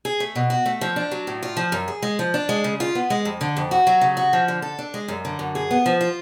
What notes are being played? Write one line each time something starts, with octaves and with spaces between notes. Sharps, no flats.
G#4
A3
B2
F#4
A3
F3
D4
F#3
A2
F4
F3
F#2
G#4
G#3
F3
D4
G#3
C#3
F4
B3
G#3
F2
D3
F2
F#4
F#3
C#3
F#4
F3
D3
A4
D4
G#3
F#2
D3
F#2
G#4
B3
F3
F4